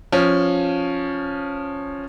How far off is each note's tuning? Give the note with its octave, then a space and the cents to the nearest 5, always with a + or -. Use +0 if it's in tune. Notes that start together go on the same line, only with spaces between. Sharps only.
F3 +10 C#4 +0